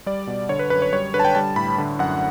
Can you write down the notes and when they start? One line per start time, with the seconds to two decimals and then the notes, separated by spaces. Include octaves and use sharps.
0.06 G3 D5
0.27 B2
0.49 D3 C#5
0.59 B4
0.70 F#2 B4
0.82 C#5
0.93 G3 C#5
1.14 D3 B4
1.20 A5
1.25 G5
1.35 G3 A5
1.56 A2 B5
1.78 D3
1.99 F#2 F#5